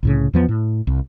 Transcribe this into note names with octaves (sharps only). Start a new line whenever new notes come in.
C2 A2 C#3
E2 F3 B3
A2
C2